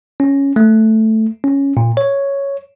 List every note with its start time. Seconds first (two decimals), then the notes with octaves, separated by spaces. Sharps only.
0.20 C#4
0.56 A3
1.44 C#4
1.77 A#2
1.97 C#5